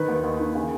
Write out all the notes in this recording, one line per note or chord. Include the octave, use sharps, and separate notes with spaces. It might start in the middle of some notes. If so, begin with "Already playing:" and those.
Already playing: D#3 B4
D#2
D#2
D#3
C#3